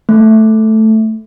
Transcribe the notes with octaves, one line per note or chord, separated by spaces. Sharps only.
A3